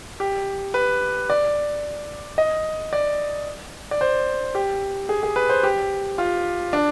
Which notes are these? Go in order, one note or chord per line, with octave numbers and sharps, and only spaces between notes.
G4
B4
D5
D#5
D5
D5
C5
G4
G#4
G#4
B4
C5
G4
F4
D4